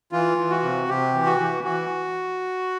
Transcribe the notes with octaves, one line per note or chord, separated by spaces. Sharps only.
E3 F4
E3
F#4
C3
C3 G4
E3
F#4
E3
E3 F#4